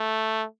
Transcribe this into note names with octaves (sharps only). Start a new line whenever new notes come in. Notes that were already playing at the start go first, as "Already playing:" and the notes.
Already playing: A3